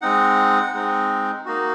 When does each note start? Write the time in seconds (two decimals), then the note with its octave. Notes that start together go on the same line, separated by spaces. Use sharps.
0.02 G#3 C4 D#4 F#5
0.74 G#3 C4 D#4
1.45 A#3 D#4 F#4